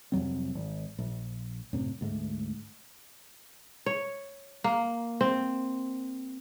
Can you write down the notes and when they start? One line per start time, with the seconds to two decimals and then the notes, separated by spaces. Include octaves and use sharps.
0.12 C2 F2 F#3 C4
0.55 G#1
0.98 A#1
1.73 F#2 A2 C3
2.01 D2 G#2 A3
3.86 C#5
4.64 A#3
5.21 C4